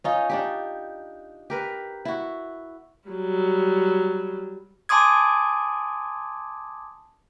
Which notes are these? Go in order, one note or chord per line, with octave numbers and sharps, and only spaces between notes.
C#4 D#4 F4
D4 D#4 G4
G4 A#4 B4
E4 F#4
F#3 G3
G#5 A5 C6 D6 D#6 G#6